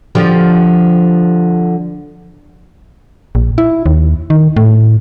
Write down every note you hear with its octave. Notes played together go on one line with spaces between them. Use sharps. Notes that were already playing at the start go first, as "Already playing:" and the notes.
D3 F3 G4
A#1
E4
D#2
D#3
A2